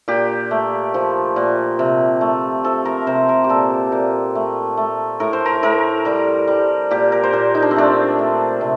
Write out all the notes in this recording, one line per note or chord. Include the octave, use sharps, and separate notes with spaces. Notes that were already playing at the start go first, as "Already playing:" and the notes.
A#2 G4
A3
F3
A#2
C3
A3
F3 A4
A#4
C3 C5
A#4
G4
A#2 A4
A#2
A3
A3
A2 A#4
C5
A#4
A2 A#4
G3 A#4
G3
A#2 G4
A#4
C5
A#2 A#4
D#4
D4
C4
A3 D4
A3
C3